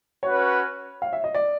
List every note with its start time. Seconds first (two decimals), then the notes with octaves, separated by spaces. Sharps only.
0.23 C#4 F#4 B4 C#5
1.02 F5
1.13 E5
1.24 D#5
1.35 D5